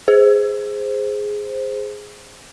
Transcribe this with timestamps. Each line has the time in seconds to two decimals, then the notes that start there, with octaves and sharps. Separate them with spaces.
0.08 G#4 C5